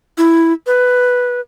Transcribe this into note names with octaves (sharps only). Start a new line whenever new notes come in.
E4
B4